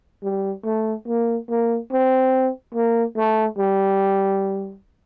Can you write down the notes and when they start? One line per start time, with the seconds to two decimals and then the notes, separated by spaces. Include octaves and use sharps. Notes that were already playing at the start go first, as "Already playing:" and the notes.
0.23 G3
0.65 A3
1.08 A#3
1.49 A#3
1.92 C4
2.75 A#3
3.17 A3
3.58 G3